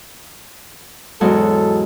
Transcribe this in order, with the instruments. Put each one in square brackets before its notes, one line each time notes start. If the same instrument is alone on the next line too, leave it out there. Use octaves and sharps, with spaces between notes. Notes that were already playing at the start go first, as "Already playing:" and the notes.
[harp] E2 G#2 F#3 [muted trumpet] A4